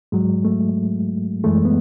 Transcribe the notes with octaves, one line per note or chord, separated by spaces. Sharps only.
G#2 F#3 G#3
A3
F#2 E3 G#3 A3
B3